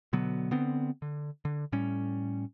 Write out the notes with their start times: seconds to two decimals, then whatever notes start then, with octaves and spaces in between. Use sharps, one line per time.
0.13 B2 D3 F#3 B3
0.51 D3 B3 C4
1.02 D3
1.45 D3
1.72 A2 G3 C#4